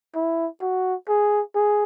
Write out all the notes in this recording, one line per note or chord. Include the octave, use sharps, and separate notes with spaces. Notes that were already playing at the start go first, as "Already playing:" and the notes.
E4
F#4
G#4
G#4